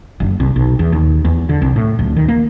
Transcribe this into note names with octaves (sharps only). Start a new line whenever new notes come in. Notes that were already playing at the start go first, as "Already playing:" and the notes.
F#1
C2
B1
E2
D#2
E2
D3
C2
A2
D1
D#3
A#3